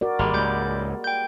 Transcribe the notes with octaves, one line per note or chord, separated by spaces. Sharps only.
F#4 A#4 D5
G#1 G3 G#3 A#3
C#2 G#2 B5 D6 G6
G5 G6